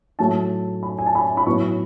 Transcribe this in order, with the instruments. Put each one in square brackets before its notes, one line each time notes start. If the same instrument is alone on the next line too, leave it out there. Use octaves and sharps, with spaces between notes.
[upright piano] A2 F#3 A3 A5
B5
G#5
A5
B5
B5
A2 F#3 B3 C#6